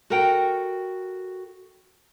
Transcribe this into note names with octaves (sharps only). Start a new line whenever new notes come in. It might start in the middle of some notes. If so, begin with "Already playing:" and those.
F#4 A4 A#4 G5